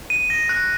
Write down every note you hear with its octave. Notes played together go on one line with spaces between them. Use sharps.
D#7
A#6
F#6